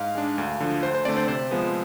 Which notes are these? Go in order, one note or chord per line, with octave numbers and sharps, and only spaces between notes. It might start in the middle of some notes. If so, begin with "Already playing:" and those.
Already playing: G#2 F5
G#3 D4
D2
D3 F3
D2 C5
C5
D3 A3 C4 D5
C5
C3 C5
F3 G#3 B3